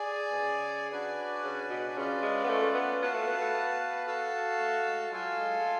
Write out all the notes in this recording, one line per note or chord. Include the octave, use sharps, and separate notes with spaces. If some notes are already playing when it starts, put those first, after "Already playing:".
Already playing: G#4 D5 G#5
B2
C#3
D4 F#4 B4 D5 G#5
C#3
B2
C#3 C#4 F4 B4 D5
G#3
B3
A3
B3
B3 F#4 B4 F5 A5
A3
B3
A3
B3
F#4 A4 F5 A5
A3
G#3
F#3 F4 A4 F5 G#5
G#3
G#3
A3